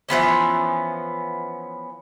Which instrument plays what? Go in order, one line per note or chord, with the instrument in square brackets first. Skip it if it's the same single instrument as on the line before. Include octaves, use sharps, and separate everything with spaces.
[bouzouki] E3 F3 B3 C#4